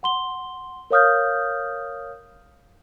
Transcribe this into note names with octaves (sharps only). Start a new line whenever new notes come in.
F#5 C6 G7
A#4 C#5 F5 D#6 F6 G6